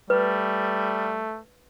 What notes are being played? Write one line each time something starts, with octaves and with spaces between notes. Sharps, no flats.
G3 A3 B4